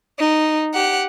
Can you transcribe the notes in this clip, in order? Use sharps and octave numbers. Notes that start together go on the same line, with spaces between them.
D#4
G4 F#5